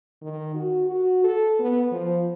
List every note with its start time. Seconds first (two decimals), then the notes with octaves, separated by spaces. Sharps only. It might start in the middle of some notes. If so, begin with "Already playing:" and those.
0.22 D#3
0.54 F#4
0.86 F#4
1.24 A4
1.59 B3
1.91 F3